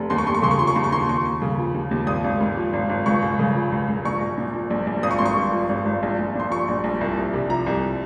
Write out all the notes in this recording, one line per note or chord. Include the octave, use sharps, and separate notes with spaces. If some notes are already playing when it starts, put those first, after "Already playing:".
Already playing: F1
D#2 C6
C#6
D#2 C6
C#6
C#3 C6
C#6
F3 C6
C#6
D#2 C6
C#6
D#2 C6
D#2 C#6
D#2
C#3
F3
D#2
D#2
G#1 D#6
G#1
G#2
F3
G#1
G#1
C#2 C#6
C#2
C#3
F3
C#2
C#2
A#1 C#6
A#1
A#2
F3
A#1
A#1
G#1 D#6
C#6
G#1 C6
C#6
G2
F3
G#1
G#1
A#1
A#1
A#2 C6
F3 C#6
A#1
A#1
C2
C2
C3
F3 A#5
C2